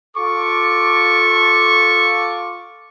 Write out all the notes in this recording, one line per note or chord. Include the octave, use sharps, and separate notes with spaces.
F4 A4 C#6 D6